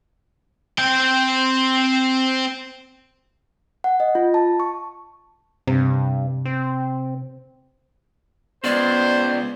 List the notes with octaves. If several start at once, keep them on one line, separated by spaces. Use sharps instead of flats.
C4 G5
F#5
D#5
F4
A5
C#6
G2 C3
C4
C#2 B3 C5 D5 G#6